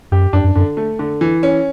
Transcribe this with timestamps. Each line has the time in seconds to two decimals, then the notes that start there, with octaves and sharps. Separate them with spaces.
0.12 F#2 G4
0.33 F#2 D4
0.44 F#2
0.55 F#2 D3
0.77 A3
0.99 D3
1.21 E3
1.43 C#4